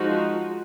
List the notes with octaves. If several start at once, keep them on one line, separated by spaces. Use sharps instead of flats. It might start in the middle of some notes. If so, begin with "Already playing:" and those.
Already playing: F3 G#3 D#4 F#4